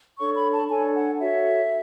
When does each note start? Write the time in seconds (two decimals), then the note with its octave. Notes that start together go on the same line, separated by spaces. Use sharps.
0.19 D4 A4 C#5 C#6
0.36 B5
0.53 A5
0.69 D4 A4 C#5 G#5
0.95 F#5
1.20 F#4 A4 C#5 E5